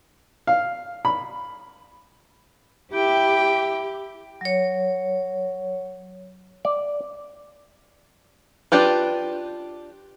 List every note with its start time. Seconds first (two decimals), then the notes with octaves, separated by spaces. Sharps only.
0.47 F5
1.05 B5
2.93 E4 G4 G5
4.41 F#3 C#5
6.65 D5
8.72 D4 F4 G4 B4